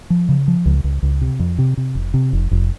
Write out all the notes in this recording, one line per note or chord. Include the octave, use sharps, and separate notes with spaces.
F3
C#3
F3
C#2
C#2
C#2
C3
F2
C3
C3
F1
C3
F1
F1